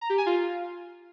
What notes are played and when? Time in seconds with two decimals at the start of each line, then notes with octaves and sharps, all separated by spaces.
0.01 A#5
0.10 G4
0.18 G#5
0.26 F4